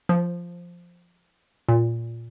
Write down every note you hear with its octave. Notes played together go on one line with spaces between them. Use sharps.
F3
A#2